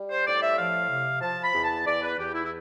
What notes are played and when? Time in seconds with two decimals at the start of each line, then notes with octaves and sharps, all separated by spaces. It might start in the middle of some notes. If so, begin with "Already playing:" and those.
Already playing: G3
0.10 C5
0.26 A2 D5
0.42 E5
0.57 F3 F5
0.89 C3
1.21 F3 A5
1.44 B5
1.54 E2
1.64 A5
1.86 E2 D5
2.02 B4
2.18 E2 G4
2.34 E4
2.44 E4